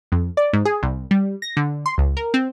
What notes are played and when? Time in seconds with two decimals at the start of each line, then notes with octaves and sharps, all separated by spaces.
0.12 F2
0.37 D5
0.53 G#2
0.65 G#4
0.83 C2
1.11 G3
1.42 A#6
1.57 D3
1.86 C6
1.98 C#2
2.17 A#4
2.34 C4